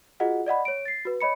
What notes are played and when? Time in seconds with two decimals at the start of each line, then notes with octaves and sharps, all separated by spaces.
0.20 F4 F#4 G#4 D#5 F#5
0.46 D5 D#5 F#5 B5
0.65 C#5 D7
0.85 A6 C7
1.05 F#4 B4
1.21 C#5 D#5 B5 C#7